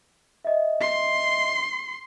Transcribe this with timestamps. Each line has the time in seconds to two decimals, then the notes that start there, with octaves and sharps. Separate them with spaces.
0.45 D#5 E5
0.81 C6